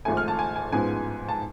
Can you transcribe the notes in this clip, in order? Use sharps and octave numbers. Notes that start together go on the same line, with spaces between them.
G#1 G#2 F3 A3 G#5
F6
A5
G#5
G#5
A1 G#2 F3 G#3 B3 G#5
A5